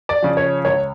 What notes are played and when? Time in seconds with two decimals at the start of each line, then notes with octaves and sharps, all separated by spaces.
0.09 D5
0.22 C#3 F3
0.37 C#5
0.65 C#2 C#5